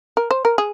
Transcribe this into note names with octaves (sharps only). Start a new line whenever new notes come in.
A#4
C5
A#4
G#4